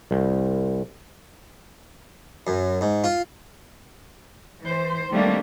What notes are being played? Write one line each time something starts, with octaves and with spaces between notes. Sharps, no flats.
C2
F#2
G#2
F4
E3 C5
D#3 G3 A3 A#3 C4 D4